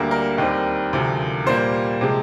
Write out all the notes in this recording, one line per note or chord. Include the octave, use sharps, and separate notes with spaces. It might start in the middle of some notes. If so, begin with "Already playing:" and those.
Already playing: D2 D3 G3 A#3 A#4
A#4
D#2 D#3 G3 C4
D2 C3 F3
A#2 G3 A#3 C5
C3 F3 G#3